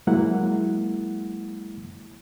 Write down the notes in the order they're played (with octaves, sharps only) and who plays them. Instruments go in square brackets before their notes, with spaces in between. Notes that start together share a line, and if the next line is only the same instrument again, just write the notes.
[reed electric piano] F#3 G#3 A#3 E4 F#5